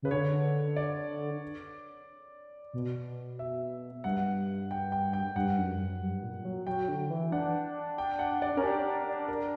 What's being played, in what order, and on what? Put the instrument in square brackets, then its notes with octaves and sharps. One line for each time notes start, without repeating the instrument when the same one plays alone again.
[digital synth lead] C#3 [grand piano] B4
[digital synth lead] D3 [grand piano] C#5
[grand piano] D5
[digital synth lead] B2
[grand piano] E5
[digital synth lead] G2 [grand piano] F#5
[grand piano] G5
G5
G5
[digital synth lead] G2 [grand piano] F#5
[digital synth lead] F#2
F#2
G2
A#2
F#3
[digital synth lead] F#3 [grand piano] G5
[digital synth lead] D3
E3
[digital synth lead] D4 [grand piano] F#5
[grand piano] G5
F#5
D5
[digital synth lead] C#4 [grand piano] A#4
[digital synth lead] D4 [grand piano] G4
[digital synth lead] D4
D4
[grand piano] A#4